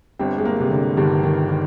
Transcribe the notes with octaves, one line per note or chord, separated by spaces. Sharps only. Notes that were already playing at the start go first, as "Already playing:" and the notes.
G1 G2 D3 G3 C4
G#3
A#3
C3
D3
G1 G2 D3 D#3 G3
D#3
D#3